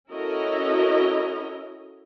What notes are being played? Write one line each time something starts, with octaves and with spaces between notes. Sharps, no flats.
C#4 E4 F#4 A4 A#4 D#5